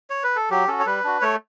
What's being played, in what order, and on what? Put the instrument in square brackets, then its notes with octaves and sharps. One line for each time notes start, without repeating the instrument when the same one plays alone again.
[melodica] C#5
B4
A4
F#3 G4
C#4 F#4 A4
C#5
G3 B4
D4 F#4
A3 C#5